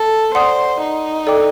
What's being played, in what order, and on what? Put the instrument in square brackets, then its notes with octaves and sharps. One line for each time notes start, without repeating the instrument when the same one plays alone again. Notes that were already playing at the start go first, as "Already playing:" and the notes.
Already playing: [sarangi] A4
[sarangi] C5 [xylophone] D5 F#5 C6 D#6
[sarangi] D#4
[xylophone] A4 D5 G5 D6